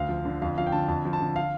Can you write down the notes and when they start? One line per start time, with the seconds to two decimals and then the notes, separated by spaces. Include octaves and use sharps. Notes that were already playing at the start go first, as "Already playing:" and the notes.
Already playing: D2 F5
0.09 F3
0.25 D3
0.42 F2 F5
0.58 F3 F5
0.66 G5
0.72 D3 A5
0.88 F2 A5
1.05 F3
1.13 A5
1.20 D3
1.36 F5